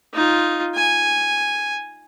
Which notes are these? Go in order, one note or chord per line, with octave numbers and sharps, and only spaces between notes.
D#4 F4
G#5